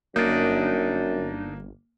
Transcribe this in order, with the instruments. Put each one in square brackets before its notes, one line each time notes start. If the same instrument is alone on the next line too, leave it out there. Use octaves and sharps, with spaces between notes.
[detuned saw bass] G1 [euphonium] F#2 [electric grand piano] A#3 [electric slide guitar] D4 D#4